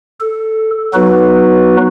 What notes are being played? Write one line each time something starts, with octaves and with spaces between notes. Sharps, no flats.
A4
F#3 B3 D#4 F#4 B4